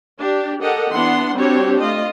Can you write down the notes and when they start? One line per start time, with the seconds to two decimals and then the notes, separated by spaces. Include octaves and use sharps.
0.20 D4 G4
0.61 G4 A4 A#4 D#5 F#5
0.92 E3 B3 D4 F#5 C6
1.35 G3 C4 D4 F#4 G4 C#5
1.79 A3 F4 D#5